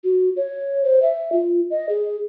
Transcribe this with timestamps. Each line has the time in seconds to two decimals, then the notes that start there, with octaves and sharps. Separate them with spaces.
0.04 F#4
0.36 C#5
0.84 C5
1.02 E5
1.32 F4
1.70 D#5
1.89 G#4